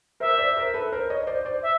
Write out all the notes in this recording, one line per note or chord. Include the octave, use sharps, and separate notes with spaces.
A#4 C5 E5
C5 D5
A#4 C5
A4 B4
A#4 C5
C#5 D#5
C5 D5
C5 D5
E5